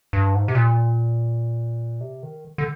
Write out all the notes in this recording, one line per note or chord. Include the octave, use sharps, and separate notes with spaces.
G2
G#2
C3
A#2
C3
D#3
D3